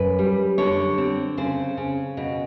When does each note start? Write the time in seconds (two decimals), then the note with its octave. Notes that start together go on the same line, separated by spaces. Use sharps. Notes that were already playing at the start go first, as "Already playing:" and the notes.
Already playing: F#2 B4
0.19 G3
0.58 D3 C#5
0.98 C4
1.37 C#3 C5
1.77 C#3
2.17 B2